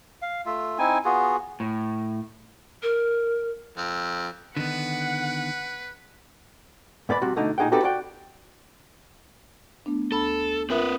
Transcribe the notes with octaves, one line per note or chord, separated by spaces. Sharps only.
F5
A3 F4 E5
C4 D#4 E4 G#5
B3 F4 F#4 G#4
A2
A#4
F2
D3 D#3 B3 B4 F#5
G#2 B3 D5 B5
C3 G3 C4 F#4
B2 D3 A3 D#4
A#2 D#4 G#4 F#5 G5
C4 D#4 F#4 G4 A4 B4
F#4 D5 F#5 G5
A3 B3 D4
D2 D4 A4 B5
C4 F4 A#4 B4 E5